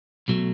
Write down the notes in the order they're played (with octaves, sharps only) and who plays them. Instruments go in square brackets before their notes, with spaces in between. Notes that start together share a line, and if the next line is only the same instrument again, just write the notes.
[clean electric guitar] B1 B2 F#3 A3